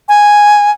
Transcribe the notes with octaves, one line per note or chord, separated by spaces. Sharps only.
G#5